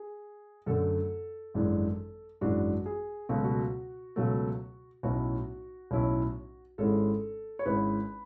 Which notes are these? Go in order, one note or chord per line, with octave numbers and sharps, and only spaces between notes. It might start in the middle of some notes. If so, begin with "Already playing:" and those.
Already playing: G#4
F#2 D3 A3 A4
G#1 F#2 E3 G#3 D4
G#1 F#2 E3 G#3 D4 F#4
G#4
C#2 B2 F#3 A3 F#4
F#4
C#2 B2 F#3 A3
B1 A2 F#3 C#4 E4 F#4
B1 A2 F#3 C#4 E4
G#1 G#2 G#3 C#4 E4 A4
C#5
G#1 G#2 G#3 C#4 E4 B4